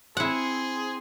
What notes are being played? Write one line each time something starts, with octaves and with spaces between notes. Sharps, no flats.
C4 E4 G#4 F#5 C6